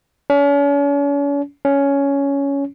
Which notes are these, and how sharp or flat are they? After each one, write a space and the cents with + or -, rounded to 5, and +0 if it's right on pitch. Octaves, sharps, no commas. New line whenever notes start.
C#4 +40
C#4 +10